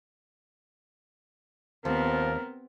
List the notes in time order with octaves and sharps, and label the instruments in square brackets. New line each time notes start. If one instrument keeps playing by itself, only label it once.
[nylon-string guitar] D#2 [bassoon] F3 [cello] B3 C4 [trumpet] A#4